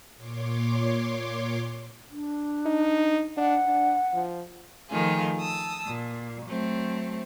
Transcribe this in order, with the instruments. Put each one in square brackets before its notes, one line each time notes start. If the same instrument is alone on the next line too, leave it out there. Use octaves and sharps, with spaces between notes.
[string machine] A#2 C#5 C6 D6
[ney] D4
[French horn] D#4
[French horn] D4 [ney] F#5
[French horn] D4
F3
[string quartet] D#3 F3 A3 F4 G#4
A5 D#6 E6
A#2
F#3 A3 C4